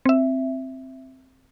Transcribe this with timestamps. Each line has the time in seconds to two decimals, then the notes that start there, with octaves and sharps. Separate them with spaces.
0.06 C4 E5